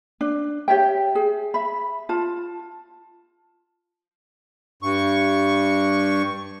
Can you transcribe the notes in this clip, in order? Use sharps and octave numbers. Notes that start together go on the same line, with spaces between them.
D4
G4 C#5 E5 G5
G#4
E5 B5
F4 A5
G2 C#6